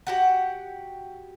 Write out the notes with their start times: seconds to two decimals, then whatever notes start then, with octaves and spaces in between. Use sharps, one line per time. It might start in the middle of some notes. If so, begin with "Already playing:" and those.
0.07 F#4 G4 F#5